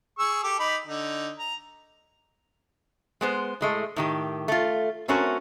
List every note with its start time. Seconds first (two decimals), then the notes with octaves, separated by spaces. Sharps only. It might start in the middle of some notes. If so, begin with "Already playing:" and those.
0.19 G#4 C#6 E6
0.44 G4 A4 D6
0.59 D#4 B5 D6
0.87 D3 D#4
1.39 A#5
3.21 G#3 B3 C5
3.61 A2 G#3 A3
3.96 A2 D#3 G4
4.48 A3 F4
5.08 A3 C4 C#4 F#4 A#4